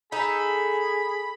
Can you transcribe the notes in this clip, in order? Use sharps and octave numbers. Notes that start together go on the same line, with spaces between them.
D#4 G#4 A4 B5